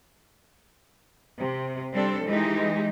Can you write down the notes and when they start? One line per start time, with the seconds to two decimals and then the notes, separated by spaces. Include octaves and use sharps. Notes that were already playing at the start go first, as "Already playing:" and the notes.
1.39 C3
1.93 G3 C4 D4 A4
2.25 E3 G#3 D#4 G4